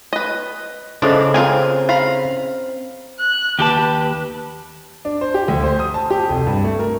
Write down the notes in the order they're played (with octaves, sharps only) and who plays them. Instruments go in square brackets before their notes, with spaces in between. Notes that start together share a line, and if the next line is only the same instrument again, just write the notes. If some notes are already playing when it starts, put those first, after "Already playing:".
[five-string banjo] B4 D#5
[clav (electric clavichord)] C#3 [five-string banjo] E3 F3 D4 [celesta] A4 C5 D#5
[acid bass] C4 [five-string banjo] F4 A#4 G#5
[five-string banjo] F5 A#5 B5
[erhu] F#6
[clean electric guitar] D#2 G4 A5 [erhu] B4
[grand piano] D4
C5
G4
D2
C5
D#6
A5
G4
F1
G2
A3
A#4